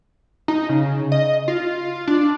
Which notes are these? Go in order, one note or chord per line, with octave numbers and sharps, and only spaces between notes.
D#4
C#3
D#5
F4
D4